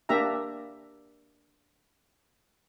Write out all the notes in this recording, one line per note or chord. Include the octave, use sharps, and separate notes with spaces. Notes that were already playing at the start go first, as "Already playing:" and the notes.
A#3 D4 G4 E5 A#5